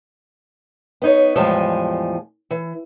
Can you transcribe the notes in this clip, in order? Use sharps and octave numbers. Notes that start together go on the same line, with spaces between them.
B3 D#4 C#5
E2 A2 F3 G3 G#3 G#5
E3